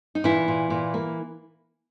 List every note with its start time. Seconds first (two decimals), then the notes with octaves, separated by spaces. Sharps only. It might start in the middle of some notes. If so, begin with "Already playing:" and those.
0.15 D#4
0.24 A#2 E3 E4
0.48 A#2
0.70 A#2
0.94 A#3